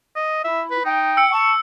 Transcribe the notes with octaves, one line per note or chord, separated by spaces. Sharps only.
D#5
E4 E5
B4
D#4 G5
E6 C#7
A5 C#6